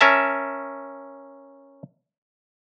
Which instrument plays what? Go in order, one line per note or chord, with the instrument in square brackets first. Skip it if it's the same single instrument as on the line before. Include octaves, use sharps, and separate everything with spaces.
[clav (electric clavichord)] C#4 A#4 E5 A5